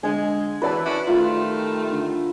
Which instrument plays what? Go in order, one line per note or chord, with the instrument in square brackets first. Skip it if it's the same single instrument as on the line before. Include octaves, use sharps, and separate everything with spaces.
[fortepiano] D3 [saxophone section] G#3 [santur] G#5
[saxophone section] E3 [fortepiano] F#4 D5 [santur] B4 A5
[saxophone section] C#4 D4 E4
[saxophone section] D#3 G3 A3 [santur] F4
[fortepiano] D3